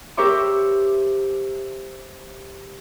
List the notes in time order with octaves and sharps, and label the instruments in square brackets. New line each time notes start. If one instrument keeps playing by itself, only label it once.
[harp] G4 A#4 C5 E5 C#6 D6